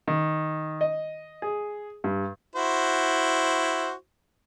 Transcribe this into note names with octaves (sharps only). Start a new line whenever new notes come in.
D#3
D#5
G#4
G2
E4 F#4 C5